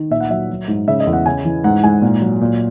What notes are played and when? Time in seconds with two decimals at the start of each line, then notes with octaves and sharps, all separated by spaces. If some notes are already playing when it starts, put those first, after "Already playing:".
Already playing: D#3
0.11 A#2 E5
0.20 F#5
0.30 F#3 E5
0.49 F#3
0.68 G#2
0.87 C#3 E5
1.00 D#5
1.07 E2
1.13 F#5
1.26 C#3 G#5
1.45 E3
1.64 G#2 F#5
1.83 G#2 G#5
2.02 A#2
2.22 F#3
2.41 A#2